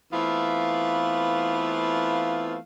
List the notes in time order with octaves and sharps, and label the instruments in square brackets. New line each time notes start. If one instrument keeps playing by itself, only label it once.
[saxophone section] E3 A3 B3 C4 F4 F5